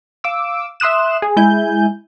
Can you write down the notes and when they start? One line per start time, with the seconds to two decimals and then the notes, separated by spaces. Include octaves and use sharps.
0.24 F5 D6 E6
0.80 E5 C6 D#6 F#6 E7
1.22 G#4
1.37 G#3 E4 G#5 G6